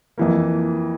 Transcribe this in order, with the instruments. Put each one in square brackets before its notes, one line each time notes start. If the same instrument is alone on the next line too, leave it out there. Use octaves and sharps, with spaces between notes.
[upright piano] F2 E3 A#3